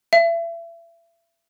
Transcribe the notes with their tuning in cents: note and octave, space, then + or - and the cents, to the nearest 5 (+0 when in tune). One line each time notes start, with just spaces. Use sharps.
E5 +35